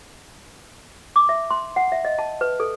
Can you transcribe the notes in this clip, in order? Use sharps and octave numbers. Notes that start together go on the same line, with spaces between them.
D6
E5
C6
F#5
E5
D#5
A5
B4
A4